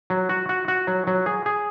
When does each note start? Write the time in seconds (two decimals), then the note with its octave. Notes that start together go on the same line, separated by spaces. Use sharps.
0.10 F#3
0.29 F#4
0.49 F#4
0.68 F#4
0.87 F#3
1.07 F#3
1.26 G#4
1.46 G#4